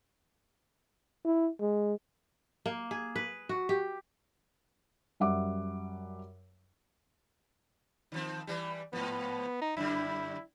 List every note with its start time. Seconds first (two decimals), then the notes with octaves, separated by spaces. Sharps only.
1.25 E4
1.60 G#3
2.66 A#3
2.91 G#4
3.16 B4
3.49 F#4
3.69 G4
5.20 F#2 G3 E5 F#5 D6
8.12 D#3 F3 C4
8.47 E3 G3
8.93 G#2 F3 B3
9.61 D#4
9.77 F#2 D3 G3 E4